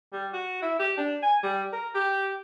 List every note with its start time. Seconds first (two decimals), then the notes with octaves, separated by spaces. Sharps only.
0.13 G3
0.33 F#4
0.62 E4
0.80 G4
0.98 D4
1.23 G#5
1.44 G3
1.73 A#4
1.95 G4